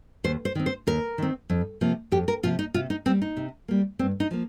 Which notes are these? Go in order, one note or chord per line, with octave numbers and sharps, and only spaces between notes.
D#2 C5
C5
D#3 C4
C5
D#2 A#4
D#3 C4
F2
C3 F3 A#3
F2 G4
A#4
C3 F3 A#3 F4
D#4
C3 F4
D#4
G3 A#3 C4
D#4
C3
G3 A#3
G2 C4
D#4
F3 A#3